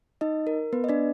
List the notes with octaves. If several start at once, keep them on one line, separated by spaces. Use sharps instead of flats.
D#4 D#5
A#4
B3 B4
D#5
D4 D5